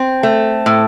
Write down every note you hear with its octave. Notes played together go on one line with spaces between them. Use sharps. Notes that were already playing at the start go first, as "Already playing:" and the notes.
Already playing: C4
A3
A2